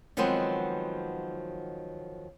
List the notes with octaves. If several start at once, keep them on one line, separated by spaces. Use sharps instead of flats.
D#3 F3 F#3 G#3 B3 C4